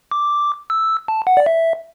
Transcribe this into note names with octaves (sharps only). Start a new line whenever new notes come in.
D6
E6
A5
F#5
D5
E5